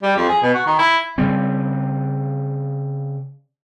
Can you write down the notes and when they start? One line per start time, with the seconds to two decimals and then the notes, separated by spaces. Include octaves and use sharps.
0.02 G3
0.16 F2
0.29 G#4
0.42 B2
0.54 F#4
0.66 D#3
0.79 E4
1.18 C#3 G3 C4